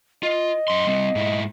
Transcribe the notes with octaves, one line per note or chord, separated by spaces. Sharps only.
F4 D#5
F#2 C6
G3 C4
G#2 E4